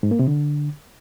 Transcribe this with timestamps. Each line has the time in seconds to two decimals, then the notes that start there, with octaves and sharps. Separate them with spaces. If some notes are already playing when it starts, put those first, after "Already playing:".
0.03 G#2
0.11 A#3
0.19 C3
0.28 D3